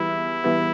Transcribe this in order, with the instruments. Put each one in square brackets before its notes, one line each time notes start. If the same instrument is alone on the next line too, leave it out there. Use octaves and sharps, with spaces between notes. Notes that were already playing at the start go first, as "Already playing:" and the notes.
Already playing: [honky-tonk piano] E3 G3 B3 [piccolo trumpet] E4
[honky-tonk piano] E3 G3 B3